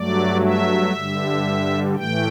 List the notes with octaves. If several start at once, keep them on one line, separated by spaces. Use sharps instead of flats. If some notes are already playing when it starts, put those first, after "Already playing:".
Already playing: G2 F#3 A3 D5
E5
G2 D3 G3
A2 E3 A3 G5